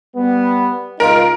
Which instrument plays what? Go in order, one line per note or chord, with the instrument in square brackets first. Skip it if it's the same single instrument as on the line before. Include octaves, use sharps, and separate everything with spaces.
[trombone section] G3 B3
[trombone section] C#2 D#4 F4 [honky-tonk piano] A#4